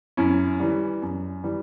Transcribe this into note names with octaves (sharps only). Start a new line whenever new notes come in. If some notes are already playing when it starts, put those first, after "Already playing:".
F#2 C#4 E4
E3 G3
F#2
E3 G3